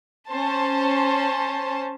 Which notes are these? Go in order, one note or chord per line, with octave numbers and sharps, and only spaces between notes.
C#4 C5 A5